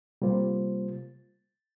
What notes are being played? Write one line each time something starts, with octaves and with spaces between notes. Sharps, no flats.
C3 G3 A#3 F4 C5